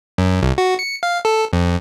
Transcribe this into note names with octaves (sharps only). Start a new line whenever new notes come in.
F#2
C2
F#4
C#7
F5
A4
F2